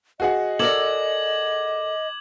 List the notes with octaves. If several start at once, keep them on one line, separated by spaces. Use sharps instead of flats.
F#4 G#4 D#5 F#5
A4 A#4 D5 D6 G#6 F#7